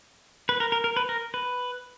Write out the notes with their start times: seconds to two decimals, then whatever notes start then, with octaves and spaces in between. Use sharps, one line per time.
0.49 B4
0.60 A#4
0.72 A#4
0.84 A#4
0.97 B4
1.09 A#4
1.34 B4